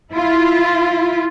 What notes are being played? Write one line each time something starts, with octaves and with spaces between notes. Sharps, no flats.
E4 F4